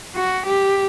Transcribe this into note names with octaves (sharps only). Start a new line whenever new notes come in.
F#4
G4